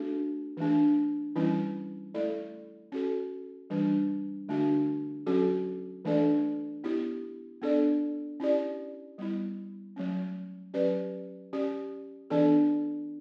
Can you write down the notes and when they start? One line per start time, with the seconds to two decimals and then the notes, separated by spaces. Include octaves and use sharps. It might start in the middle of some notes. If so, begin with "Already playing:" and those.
Already playing: A3 D4 F#4 A4
0.57 E3 A3 D4
1.35 E3 G3 C#4 E4
2.14 A3 E4 A4 D5
2.92 C#4 F#4 A4
3.70 E3 G3 D4
4.48 D3 A3 D4 F#4
5.26 F#3 C#4 F#4 A4
6.05 E3 A3 D4 A4 D5
6.84 B3 E4 G4
7.62 B3 D4 A4 D5
8.40 C#4 E4 G4 D5
9.18 G3 B3 E4
9.96 F#3 A3 C#4
10.74 F#3 C#4 G4 B4 D5
11.53 C#4 G4 D5
12.30 E3 B3 D4 A4 D5